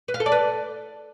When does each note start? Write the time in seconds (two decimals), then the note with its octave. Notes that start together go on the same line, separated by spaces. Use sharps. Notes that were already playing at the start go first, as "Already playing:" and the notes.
0.08 B4
0.14 F5
0.20 A4
0.26 D5
0.32 B4